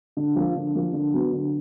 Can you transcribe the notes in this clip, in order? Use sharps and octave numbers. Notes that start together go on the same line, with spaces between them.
D3
F3 A#3
D3
F3 A#3
D3
F#3 B3
D3